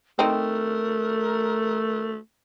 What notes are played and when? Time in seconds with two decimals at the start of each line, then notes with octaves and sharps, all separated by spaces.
0.19 A3 C4 D#4 A#4